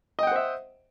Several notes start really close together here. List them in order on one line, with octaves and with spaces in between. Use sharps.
D#5 G5 F#5 C5 E5